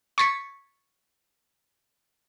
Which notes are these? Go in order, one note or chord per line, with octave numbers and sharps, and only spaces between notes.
C#6 G#6 A6 B6 C#7